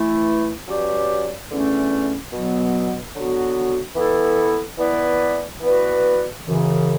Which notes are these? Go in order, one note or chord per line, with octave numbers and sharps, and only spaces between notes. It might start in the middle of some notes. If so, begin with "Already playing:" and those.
Already playing: E3 A3 E4
F#3 C#4 G4 B4 D5
E2 D3 A3 C#4
B2 F#3 B3
D3 F#3 B3 F#4
E3 B3 E4 A4
E3 B3 E4 B4 D5
E3 B3 F#4 B4 D5
F#2 C#3 E3